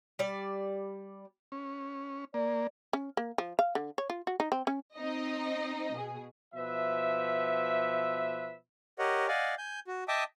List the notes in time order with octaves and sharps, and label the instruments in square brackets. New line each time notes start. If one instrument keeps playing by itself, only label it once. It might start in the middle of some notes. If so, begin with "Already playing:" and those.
[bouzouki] G3 D5
[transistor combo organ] C#4
[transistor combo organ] A#3 [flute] D5
[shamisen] C#4
A#3
F3
F5
D3
C#5
F4
F#4
D#4
C4
C#4
[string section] C4 D#4 D#5
B2 G#4
[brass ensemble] B2 F3 B4 E5
[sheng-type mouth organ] G4 A#4 C#5 D#5 F#5
D5 D#5 F5 F#5 G#5
G#5 G6
F#4
D#5 E5 G5 A5 D6 D#6